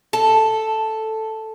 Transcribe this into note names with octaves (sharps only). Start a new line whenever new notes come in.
A4